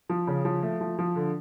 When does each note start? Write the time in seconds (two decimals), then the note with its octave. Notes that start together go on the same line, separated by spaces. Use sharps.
0.10 F3
0.27 C#3
0.45 F3
0.63 A3
0.81 F3
0.99 F3
1.16 D3